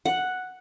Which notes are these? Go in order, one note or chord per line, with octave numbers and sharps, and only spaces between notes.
F#5